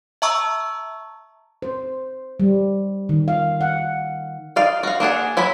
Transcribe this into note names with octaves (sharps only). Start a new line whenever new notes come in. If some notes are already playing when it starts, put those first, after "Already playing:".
E5 A5 A#5 C#6 E6
C5
G3
D#3
F5
F#5
D#4 D5 F5
F#4 F5
A#3 D4 G#4 F#5
F#3 E4 G#5 B5